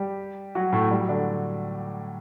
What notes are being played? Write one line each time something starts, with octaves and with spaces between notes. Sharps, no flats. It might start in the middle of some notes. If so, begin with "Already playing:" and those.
Already playing: G3 G4
F#3 F#4
A2 A3
G3
F#3
D3 D4